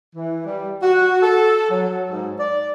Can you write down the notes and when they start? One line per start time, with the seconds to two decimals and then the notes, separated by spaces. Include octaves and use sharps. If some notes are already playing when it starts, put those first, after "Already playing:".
0.15 E3
0.46 G3
0.83 F#4
1.22 A4
1.70 F#3
2.10 G#2
2.39 D5